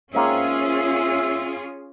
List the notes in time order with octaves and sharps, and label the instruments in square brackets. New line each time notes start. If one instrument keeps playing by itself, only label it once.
[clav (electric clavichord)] G#2 A#3 C4 [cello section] C#4 F4 G#4 [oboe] E5